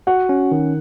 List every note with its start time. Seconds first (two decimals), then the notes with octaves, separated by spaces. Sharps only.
0.07 F#4 F#5
0.29 C#4
0.52 D#3